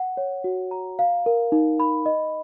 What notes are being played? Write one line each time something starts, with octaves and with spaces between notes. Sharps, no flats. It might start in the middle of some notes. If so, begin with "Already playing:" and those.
Already playing: F#5
C#5
F#4
A#5
F5
A#4
D#4
B5
D#5